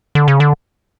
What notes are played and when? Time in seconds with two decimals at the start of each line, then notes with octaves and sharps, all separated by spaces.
0.15 D3
0.28 C#3
0.40 D3